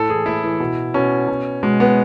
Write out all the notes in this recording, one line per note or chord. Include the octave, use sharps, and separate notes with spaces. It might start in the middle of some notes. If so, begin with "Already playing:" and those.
Already playing: A2 A4
E3 G#4
A2 E4
E3
B2
B2 C#4
B2
B2 G#3
B3